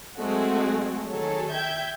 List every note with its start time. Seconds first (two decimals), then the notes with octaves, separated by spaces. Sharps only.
0.19 F#3 G#3 A3 C4 F#4 G#4
1.10 D#3 F#3 G#4 A4 C#5
1.53 E5 G5 G6 G#6